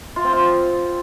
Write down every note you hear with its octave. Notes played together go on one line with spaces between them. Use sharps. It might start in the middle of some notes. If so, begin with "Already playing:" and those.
F4
C4
F4